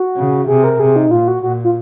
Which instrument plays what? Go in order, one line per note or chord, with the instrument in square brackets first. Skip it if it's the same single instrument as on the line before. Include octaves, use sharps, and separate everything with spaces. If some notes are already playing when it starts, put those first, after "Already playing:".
Already playing: [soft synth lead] F#4
[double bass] C#3
[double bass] C3 [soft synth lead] G#4
[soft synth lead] A#4
[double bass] C3 [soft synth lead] G#4
[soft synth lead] D#4
[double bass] A#2 [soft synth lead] F4
[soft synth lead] F#4
[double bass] A#2 [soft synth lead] F#4
[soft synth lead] F4